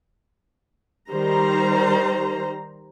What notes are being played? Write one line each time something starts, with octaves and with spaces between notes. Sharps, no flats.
D#3 G3 C5 A#5